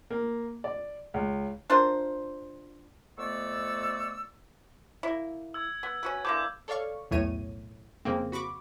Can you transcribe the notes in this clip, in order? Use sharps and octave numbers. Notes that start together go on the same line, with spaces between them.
A#3
D5
C#2
D4 F4 A#4 C5
F2 A3 B3 D5 C#6 E6
A#3 E4
E6 G#6
B3
C#4 F#4 B4
D3 E3 A#3 D6 G6
A4 C#5 D5 F5 C#6
B1 E2 A2 A3 C#5 D#7
F2 C#3 A#3 C4
F#4 B5 C#6 D6